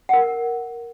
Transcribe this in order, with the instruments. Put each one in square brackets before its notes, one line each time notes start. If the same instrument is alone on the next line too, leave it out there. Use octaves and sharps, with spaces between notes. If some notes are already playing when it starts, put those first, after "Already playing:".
[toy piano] A#4 F#5